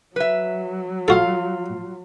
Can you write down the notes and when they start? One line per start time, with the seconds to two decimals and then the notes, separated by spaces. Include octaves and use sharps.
0.16 F#3 B4 E5
1.08 F4 F#4 A4 F5